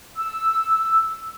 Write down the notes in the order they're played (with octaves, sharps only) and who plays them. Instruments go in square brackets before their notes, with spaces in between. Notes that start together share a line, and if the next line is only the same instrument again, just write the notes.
[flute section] E6